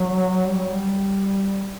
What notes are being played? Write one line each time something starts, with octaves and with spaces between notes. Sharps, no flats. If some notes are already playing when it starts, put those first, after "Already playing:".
Already playing: F#3
G3
F#3
G3